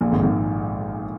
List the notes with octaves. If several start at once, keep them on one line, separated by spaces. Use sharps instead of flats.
A#1 A#2
G#1 G#2
G#1 G#2